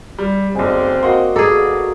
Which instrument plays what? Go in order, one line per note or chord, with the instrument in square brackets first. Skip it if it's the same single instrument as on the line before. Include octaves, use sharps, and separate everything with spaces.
[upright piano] G3
[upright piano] F#1 B1 [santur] G#3 D5 [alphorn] C4
[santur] A#3 F#4 [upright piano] D#5 F#5 C6
[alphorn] B2 [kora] G#4 A4 [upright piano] A#5 D6